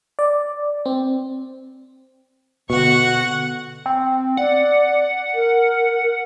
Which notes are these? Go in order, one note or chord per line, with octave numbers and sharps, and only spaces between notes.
D5
C4
B2 D3 F#4 F#5 C#6
C4
D5 F#5
A#4